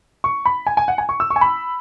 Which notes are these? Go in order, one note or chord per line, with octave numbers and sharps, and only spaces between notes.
C#6
B5
G#5
G#5
F#5
G#5
C#6
E6
C#6
G#5
B5